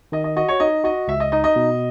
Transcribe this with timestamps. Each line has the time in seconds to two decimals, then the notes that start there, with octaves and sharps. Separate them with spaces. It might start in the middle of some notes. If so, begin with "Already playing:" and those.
0.12 D#3 D#5
0.24 D#5
0.37 F#4 D#5
0.48 C#5
0.60 D#4 D#5
0.84 F#4 D#5
1.08 C#2 E5
1.20 D#5
1.32 D#4 D#5
1.44 D#5
1.56 B2